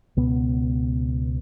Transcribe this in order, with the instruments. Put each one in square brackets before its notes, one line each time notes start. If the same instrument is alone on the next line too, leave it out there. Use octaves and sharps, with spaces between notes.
[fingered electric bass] C#2 B2 B3